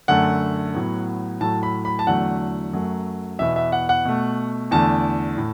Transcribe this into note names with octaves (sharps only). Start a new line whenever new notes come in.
F#2 D3 A3 F#5
A2 F#3 B3
A2 F#3 A3 A5
B5
B5
A5
E2 D3 F#3 A3 F#5
F#2 F#3 A3
E2 B2 B3 E5
E5
F#5
F#5
B2 A3
E2 D3 A3 A5
A2